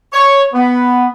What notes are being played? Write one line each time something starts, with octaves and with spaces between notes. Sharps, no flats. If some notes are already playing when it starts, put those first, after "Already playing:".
C#5
B3